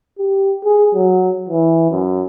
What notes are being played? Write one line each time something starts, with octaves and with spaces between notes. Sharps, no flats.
G4
G#4
F#3
E3
F#2